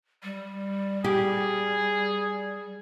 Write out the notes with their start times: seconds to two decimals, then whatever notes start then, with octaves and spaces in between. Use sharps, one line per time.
0.24 G3
1.04 G4 G#4